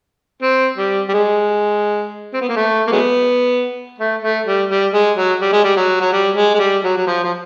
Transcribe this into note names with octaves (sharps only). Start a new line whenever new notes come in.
C4
G3
G3
G#3
C4
B3
A#3
A3
A#3
F#3 G#3 B3
A3
A3
G3
G3
G#3
F#3
G3
G#3
G3
F#3
F#3
G3
G#3
G#3
G3
F#3
F#3
F3
F3